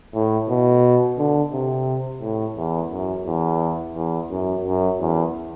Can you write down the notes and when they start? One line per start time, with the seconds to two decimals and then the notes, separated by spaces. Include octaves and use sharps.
0.14 A2
0.49 B2
1.18 D3
1.53 C3
2.21 A2
2.57 E2
2.91 F#2
3.26 E2
3.95 E2
4.30 F#2
4.65 F#2
4.99 E2